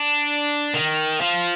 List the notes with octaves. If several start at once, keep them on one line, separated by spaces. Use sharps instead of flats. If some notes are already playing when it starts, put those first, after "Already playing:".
Already playing: D4
D#3
F3